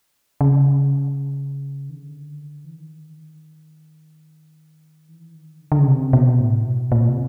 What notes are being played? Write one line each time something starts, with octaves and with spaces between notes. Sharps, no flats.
C#3
D#3
D3
E3
D#3
E3
D#3
D3
D3
C#3
C3
B2
A2
B2
A#2
C3